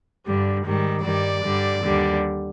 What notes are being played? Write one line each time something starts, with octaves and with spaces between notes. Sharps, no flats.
G2 D3 G3
G#2 D#3 G3
G2 D#3 G3 D5
G2 D3 G3
D#2 D3 G3